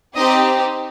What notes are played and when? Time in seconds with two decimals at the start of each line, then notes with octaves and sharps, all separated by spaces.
0.16 C4 D#4 G4 D#5